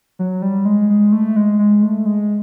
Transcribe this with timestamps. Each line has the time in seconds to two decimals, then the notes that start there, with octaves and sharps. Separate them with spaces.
0.19 F#3
0.42 G3
0.65 G#3
0.90 G#3
1.12 A3
1.36 G#3
1.59 G#3
1.83 A3
2.06 G#3